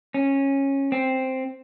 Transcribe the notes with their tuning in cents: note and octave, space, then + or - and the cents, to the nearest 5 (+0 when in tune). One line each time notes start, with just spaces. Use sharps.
C#4 -15
C4 +0